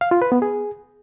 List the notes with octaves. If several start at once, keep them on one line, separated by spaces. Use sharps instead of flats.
F5
F4
B4
B3
G#4